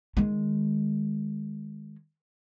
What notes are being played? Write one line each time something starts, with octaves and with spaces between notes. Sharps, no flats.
D#3 G#3